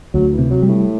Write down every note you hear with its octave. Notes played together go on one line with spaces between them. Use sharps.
D2 F#3
E3
C3
F#3
G3
A2